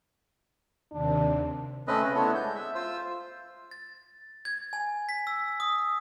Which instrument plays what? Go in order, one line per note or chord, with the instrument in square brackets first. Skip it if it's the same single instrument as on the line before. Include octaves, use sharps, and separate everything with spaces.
[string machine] D#2 C3 [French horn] D4
[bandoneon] A3 C4 C#4 B4 D#5
C#3 C#4
A3 B3 D4 E4 A4 C#5
G#3 G6
E5
F4 C5 E6
[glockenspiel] A6
G#6
G#5
B6
E6
D#6